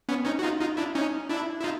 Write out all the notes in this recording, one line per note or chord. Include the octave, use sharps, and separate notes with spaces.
B3 C#4
C#4 D#4
F#4
D#4 F4
D#4 F4
D4 E4
C#4 D#4
D4 E4
E4
D#4 F4